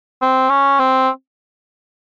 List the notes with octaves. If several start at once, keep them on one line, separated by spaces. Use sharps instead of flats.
C4
C#4
C4